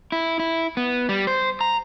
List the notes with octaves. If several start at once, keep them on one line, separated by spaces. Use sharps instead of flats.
E4
E4
B3
G3
C5
A#5